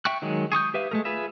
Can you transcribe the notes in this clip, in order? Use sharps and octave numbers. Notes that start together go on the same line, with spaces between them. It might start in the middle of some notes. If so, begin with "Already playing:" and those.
E5 G5 C#6 F#6
D#3 F#3 G#3
G#4 C#6 D#6 G6
G4 B4 E5 F5
G#3 A3 A#4
F4 G#4 B4 E5